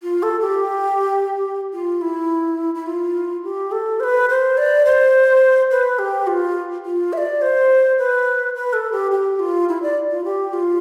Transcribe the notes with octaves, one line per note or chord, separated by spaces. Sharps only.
F4
A4
G4
F4
E4
E4
F4
G4
A4
C5
B4
C5
D5
C5
B4
G4
F4
F4
E5
D5
C5
B4
B4
A4
G4
G4
F4
E4
D5
F4
G4
F4